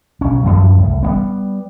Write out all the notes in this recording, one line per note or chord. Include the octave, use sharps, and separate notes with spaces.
B1 C#4
F#2 A2 F3 A3
C2 A2
G3 A#3 B3